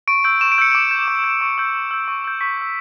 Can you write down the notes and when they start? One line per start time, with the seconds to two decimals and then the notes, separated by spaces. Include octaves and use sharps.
0.08 C#6 D7
0.24 E6 G6 D7
0.41 C#6 E7
0.52 D7
0.58 E6 G6 C#7
0.72 D6 D7
0.91 G6
1.08 D6
1.24 G6
1.41 C#6
1.58 E6 G6
1.74 C#6
1.91 E6 G6
2.08 C#6
2.24 E6 G6
2.41 C#6 B6
2.58 E6 G6